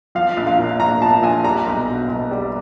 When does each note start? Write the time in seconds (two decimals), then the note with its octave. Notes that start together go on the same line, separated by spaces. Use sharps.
0.15 F3 F5
0.37 A#1
0.47 F5
0.58 A#2
0.80 A#1 A#5
1.01 F3 A5
1.23 A#1 G#5
1.44 G3 A#5
1.67 B1
1.88 B2
2.09 B1
2.31 G3